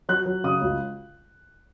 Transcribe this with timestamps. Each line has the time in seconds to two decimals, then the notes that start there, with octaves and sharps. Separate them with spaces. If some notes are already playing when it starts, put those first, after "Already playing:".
0.09 F#3 F#6
0.26 F#3
0.44 C#3 D#6
0.62 C#2